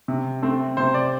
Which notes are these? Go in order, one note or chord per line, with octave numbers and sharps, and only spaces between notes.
C3
A3 C4
C3 C5
D5